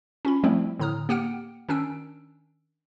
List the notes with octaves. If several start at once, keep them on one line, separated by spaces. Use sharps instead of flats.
C#4 F4 B5
F3 G3 A3 C4 E4
A2 D3 A#5 D#6 F6
A#3 G4 F#5 G5 F6 D7
D#3 C#4 D4 E6 D7